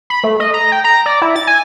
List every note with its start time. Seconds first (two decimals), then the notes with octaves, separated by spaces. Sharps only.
0.10 B5
0.24 A3
0.40 D#5
0.54 A#5
0.72 G5
0.84 A#5
1.06 D5
1.22 E4
1.36 A6
1.47 G#5